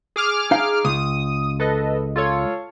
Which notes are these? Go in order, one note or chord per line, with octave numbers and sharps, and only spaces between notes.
G#4 D6 F6
D#4 F5
C#2 D#6
A4 B4 D#5
F4 A4 C#5